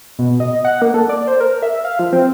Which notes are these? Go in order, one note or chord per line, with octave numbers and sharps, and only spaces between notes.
B2
D#5
F#5
A#3
A4
D5
C5
A#4
E5
F5
F3
C4